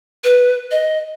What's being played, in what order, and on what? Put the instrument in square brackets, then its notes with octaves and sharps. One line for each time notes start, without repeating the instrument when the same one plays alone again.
[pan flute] B4
D#5